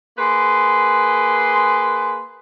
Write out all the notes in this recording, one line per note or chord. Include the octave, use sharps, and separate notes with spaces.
A#3 G#4 B4 C6